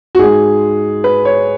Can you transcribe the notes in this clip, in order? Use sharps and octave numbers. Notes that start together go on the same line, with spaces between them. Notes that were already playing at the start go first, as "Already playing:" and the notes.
F#4
G#2 G#3 G#4
B4
C#5